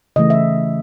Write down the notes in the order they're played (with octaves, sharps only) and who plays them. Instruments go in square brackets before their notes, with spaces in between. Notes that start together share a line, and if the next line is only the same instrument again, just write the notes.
[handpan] C#3 E3 A3 D#5
E5